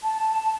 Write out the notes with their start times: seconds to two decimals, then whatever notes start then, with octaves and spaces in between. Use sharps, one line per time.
0.02 A5